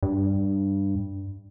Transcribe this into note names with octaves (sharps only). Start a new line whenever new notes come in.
G2